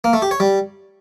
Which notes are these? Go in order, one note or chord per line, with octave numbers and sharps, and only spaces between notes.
A#3
A3
G4
C#5
G3